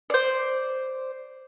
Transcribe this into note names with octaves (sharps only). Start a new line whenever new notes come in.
C5 D5